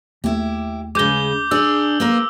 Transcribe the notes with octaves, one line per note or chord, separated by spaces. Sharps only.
D#2 A3 E4 G4
C#3 G#3 D6 G6 G7
D4 G#4 E6 F#7
A#3 F4 A#4